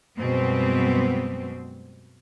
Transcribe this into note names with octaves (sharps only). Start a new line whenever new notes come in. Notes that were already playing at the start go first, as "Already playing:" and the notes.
F#2 B2 G3 G#3 B3 C4